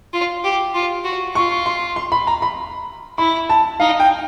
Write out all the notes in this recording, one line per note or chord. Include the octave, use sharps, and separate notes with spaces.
F4
G4
F4
F#4
F4 C#6
C6
C6
B5
A#5
B5
E4 B5
A5
D#4 F5
G5